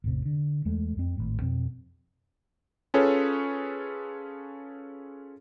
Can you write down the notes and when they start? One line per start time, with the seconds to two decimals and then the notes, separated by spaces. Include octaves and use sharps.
0.04 A1 E2 C3
0.26 D3
0.65 E2 G#3 A3
0.97 F2 C4
1.17 G#1 A2
1.42 F2 B2 C4
2.94 C#4 F4 G#4 A4 B4 C#5